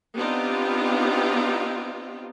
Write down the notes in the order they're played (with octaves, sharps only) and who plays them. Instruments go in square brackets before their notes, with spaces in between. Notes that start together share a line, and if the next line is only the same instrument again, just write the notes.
[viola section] B3 C4 D4 D#4 F4 G4